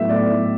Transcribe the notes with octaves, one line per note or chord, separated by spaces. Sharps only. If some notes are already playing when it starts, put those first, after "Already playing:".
Already playing: A2 F#3 B3 E5
D5